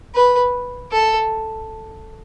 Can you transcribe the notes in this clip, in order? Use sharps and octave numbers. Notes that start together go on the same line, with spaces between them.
B4
A4